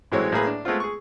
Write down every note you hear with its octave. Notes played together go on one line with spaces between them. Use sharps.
A1 E3 F#3 G#3 C4 C#5
A2 A#3 G#4 B4
D4
G#3 A3 B3 C4 F4
G#4 C#6